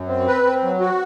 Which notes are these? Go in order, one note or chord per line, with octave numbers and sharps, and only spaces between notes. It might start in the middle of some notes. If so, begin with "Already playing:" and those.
Already playing: F#2
C4
B4
C4
F#3
F#4